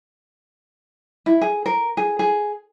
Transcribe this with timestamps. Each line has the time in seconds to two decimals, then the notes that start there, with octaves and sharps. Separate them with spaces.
1.26 E4
1.42 G#4
1.66 A#4
1.97 G#4
2.19 G#4